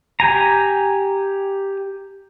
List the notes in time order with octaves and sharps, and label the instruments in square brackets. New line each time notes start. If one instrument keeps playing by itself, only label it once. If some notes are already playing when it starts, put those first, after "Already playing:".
[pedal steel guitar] G4 G#5 A#5